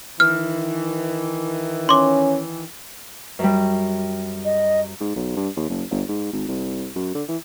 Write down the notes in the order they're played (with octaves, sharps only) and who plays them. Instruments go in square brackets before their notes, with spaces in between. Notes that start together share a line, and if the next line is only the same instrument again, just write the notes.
[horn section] D#3 E3 [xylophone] F6
[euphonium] C#4 [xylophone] C6 D6
[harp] F#2 G3
[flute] D#5
[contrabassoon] G#2
B1
G2
D#2
F#1
G1
G#2
G#1
C2
F#2
D3
E3